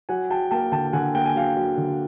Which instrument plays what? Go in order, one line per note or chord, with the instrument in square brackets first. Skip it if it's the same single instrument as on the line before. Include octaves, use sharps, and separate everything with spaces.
[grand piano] F#3 F#5 G#5
F#3 G5 A5
A#3 G5 A5
D3 G5 A5
D3 F#5 G#5
A#3 G5
G#5
F#3 F5 G5
F#3
D3